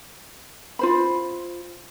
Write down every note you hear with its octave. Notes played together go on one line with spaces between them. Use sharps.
F4 C5 B5